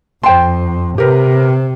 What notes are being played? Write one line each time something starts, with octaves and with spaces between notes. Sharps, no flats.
F2 C5 G5 A5 C6
C3 G4 A#4 B4